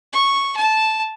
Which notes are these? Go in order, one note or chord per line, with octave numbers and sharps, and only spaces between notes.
C#6
A5